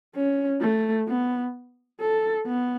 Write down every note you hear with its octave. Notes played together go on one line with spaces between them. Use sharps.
C#4
A3
B3
A4
B3